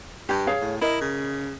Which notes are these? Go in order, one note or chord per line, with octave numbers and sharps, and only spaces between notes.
G2 G4
G#4 C#5 F5
A2
E4 A#4 D#5
C#3